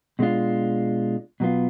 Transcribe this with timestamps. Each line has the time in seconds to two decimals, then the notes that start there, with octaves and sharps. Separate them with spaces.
0.19 B2 G#3 D4 F4
1.40 B2 F#3 B3 F4